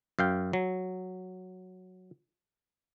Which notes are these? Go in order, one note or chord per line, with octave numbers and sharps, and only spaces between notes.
F#2 F5 G5
F#3